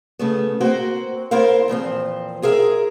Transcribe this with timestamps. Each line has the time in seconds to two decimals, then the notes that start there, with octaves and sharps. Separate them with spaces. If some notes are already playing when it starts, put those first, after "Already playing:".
0.19 C#3 A3 B3
0.61 A#3 C4 F#4 C5
1.31 B3 E4 A#4 C5 F5
1.68 E2 A#2 F3 C4
2.42 F4 G#4 A#4 E5